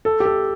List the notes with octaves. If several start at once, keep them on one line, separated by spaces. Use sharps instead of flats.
A4
G4
A4